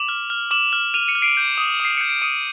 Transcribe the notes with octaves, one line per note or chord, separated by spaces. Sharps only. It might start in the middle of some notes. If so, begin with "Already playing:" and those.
Already playing: D6 E7 F#7
F6
F6
D6 E7 F#7
F6
F6 D#7 F7
C#7 D#7
F6
C7 D7
G6
D#6
D#6 C7
G6 C#7
D7
D#6 C#7 D#7